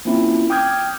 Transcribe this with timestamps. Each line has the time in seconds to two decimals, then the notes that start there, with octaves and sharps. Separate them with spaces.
0.05 A#3 C4 C#4 E4 F4
0.50 G5 D6 D#6 F6 G6 G#6